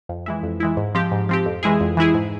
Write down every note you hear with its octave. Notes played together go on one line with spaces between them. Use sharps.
F2
E3 G#3 E4
F2
E3 G#3 E4
G#2
F3 C4 G4
G#2
F3 C4 G4
F2
E3 G#3 E4 G#4
F2
E3 G#3 E4 G#4
G#2